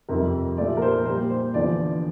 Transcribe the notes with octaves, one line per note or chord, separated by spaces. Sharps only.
F2 C3 G3 A#4
A#2 F3 A3 D5
A#4
C5
A#2 G3 C5
C5
E2 D3 F3 D5